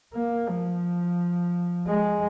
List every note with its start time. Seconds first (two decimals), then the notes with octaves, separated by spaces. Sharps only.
0.14 A#3
0.49 F3
1.87 G#3